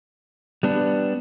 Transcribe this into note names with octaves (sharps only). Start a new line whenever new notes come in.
G3 B3 D4